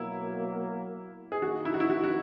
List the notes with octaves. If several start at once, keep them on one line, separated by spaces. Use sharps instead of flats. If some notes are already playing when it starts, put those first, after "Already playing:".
Already playing: B2 F#3 A#3 E4
G#4
D#3 A#3 D#4 F#4
E4
F#4
E4
F#4
F#4